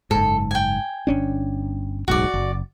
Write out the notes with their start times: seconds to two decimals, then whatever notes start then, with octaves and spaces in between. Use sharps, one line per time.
0.11 F#1 G#2 A4
0.51 G5 G#5
1.07 G1 C#4 D4
2.08 D1 B1 G#2 F#4 D5
2.34 F#1